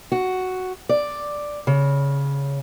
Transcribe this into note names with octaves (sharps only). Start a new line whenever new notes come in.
F#4
D5
C#3